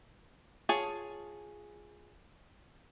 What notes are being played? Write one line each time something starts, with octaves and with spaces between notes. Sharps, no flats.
F4 G#4 C#5 G#5 A5